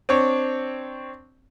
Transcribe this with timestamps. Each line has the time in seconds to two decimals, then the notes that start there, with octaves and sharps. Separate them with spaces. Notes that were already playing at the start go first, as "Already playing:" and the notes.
0.09 C4 D4 C#5